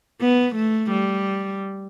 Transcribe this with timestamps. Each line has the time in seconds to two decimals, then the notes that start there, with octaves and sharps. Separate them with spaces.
0.21 B3
0.56 A3
0.90 G3